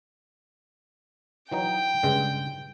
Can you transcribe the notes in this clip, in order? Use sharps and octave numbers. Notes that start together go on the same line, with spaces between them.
E3 F#3 D#4 G5
G2 C#3 G#3